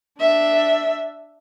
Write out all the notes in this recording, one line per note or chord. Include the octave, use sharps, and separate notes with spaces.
D4 E5